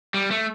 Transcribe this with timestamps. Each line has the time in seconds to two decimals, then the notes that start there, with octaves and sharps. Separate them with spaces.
0.14 G3
0.31 A3